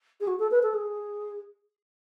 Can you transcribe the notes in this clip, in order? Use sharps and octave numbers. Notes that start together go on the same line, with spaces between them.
G#4
F#4
A4
B4
A4
G#4